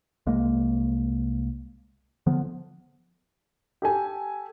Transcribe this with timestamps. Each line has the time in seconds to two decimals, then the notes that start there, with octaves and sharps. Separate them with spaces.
0.27 C2 G#3 A#3
2.26 D3 F3 B3
3.82 G4 A4 G#5